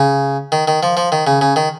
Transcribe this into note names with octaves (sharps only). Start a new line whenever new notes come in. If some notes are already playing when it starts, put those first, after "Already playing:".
Already playing: C#3
D#3
D#3
F3
F3
D#3
C#3
C#3
D#3